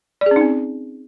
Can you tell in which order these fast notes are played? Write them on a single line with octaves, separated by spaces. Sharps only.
D5 G#4 C#4 D#4 C4